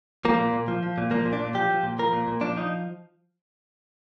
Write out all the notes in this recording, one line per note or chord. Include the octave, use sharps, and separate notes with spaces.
F3 A#3
A#2
A#2
F3
F3
A#2
F3 A#3
A#2
D4
A#2
F3 G4
F3
A#2
F3 A#4
A#2
A#2
F3 D4
F3 D#4